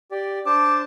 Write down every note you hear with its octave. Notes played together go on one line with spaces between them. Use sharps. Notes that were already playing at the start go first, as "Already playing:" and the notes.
G4 D5
D4 C5 A5 D6